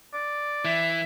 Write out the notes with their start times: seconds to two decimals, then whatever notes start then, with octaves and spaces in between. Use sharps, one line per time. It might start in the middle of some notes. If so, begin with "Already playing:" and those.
0.14 D5
0.65 E3 E5